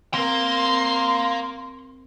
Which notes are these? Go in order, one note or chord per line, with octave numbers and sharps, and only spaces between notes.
A#3 C4 A#4 C6